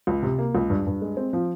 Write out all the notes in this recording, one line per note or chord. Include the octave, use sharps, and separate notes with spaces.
C#2
C3
A#3
C#2
G2
G2
G#3
C4
F3